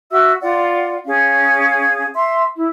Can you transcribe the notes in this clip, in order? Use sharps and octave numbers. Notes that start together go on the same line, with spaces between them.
F#4 E5 E6
F4 D5 F#5
C#4 G#4 F5
E5 C6
E4